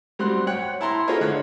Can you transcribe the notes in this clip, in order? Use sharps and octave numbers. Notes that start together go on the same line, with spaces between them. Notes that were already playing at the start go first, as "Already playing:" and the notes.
F#3 G3 C4 C6 F#6
C#5 F#5 G5 F#6
E4 A5 A#5 C6
F4 G#4 A4 C5 C#5 D#5
D3 C#5 F#6